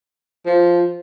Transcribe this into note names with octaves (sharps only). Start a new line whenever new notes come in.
F3